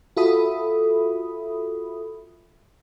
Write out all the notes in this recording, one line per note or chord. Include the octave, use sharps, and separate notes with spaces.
F4 F#4 A4 E5 B5 D#6